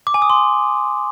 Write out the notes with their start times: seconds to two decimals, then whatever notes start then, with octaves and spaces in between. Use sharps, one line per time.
0.07 D6
0.14 G#5
0.22 D#6
0.30 C6